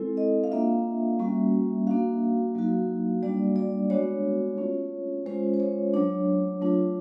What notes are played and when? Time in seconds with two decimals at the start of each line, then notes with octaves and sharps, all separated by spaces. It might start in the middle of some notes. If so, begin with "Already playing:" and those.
Already playing: G#3 C4 E4 A4
0.17 D#5
0.44 F5
0.51 A#3 D4 F4 E5
1.19 G3 A#3 C#4 F#4
1.87 A#3 D4 F#4 F5
2.55 F#3 A#3 D#4 F#4
3.23 G3 A#3 D4 F#4 D5
3.56 D5
3.90 G#3 B3 D4 F#4 C#5
4.57 A3 C#4 F4
5.26 G#3 C#4 F4 C5
5.54 C5
5.60 C#5
5.94 F#3 A3 D4 C#5
6.61 F#3 A3 D4 F4